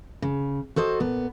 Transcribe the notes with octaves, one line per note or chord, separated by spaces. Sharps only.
C#3
F#4 A4 C5 D#5
A#2 B3